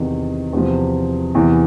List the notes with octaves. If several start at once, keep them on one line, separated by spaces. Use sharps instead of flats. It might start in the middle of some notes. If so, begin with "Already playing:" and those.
Already playing: E2 C3 D#3
E2 C3 F3
E2 C3 E3